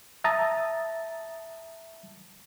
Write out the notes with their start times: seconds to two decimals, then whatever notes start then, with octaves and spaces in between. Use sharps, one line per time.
0.24 E5 A5 A#5 D#6 A6